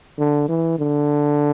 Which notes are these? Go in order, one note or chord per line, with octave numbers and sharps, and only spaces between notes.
D3
E3
D3